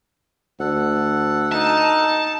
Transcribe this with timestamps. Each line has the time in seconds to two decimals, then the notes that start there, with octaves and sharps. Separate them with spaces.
0.60 D2 A4 F#5
1.52 D#4 A5